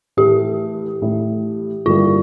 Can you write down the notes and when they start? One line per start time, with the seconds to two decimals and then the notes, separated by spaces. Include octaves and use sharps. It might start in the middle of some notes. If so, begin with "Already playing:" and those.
0.17 A2 E3 A3 G4
1.02 A2 E3 A3
1.86 G2 D3 G3 A#3 E4 F4